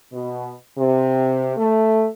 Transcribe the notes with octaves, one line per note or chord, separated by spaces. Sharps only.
B2
C3
A3